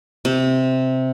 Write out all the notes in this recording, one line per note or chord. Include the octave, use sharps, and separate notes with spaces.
C3